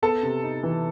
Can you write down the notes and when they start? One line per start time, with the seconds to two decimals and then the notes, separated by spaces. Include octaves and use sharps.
0.02 B3 A4 A5
0.23 C3
0.43 D#4
0.63 E3